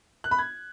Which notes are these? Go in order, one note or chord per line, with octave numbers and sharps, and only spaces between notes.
F#6
B5
G#6